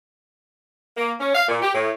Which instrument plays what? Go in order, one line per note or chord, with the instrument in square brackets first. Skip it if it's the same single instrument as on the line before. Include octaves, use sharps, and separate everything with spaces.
[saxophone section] A#3
C#4
F5
A#2
G4
A2